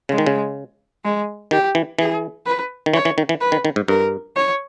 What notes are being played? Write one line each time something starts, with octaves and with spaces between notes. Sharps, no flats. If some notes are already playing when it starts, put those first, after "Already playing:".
C#3 G#3
D#3
C#3
G#3
D#3 G4
E3
E3 G#4
B4
D#3
E3 C#5
E3
D#3
E3
B4
D#3
D#3
G#2
G2 A#4
C#5